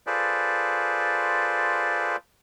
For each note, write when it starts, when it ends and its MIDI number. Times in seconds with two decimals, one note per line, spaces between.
0.07 2.16 65
0.07 2.16 68
0.07 2.16 69
0.07 2.16 71
0.07 2.16 72
0.07 2.16 74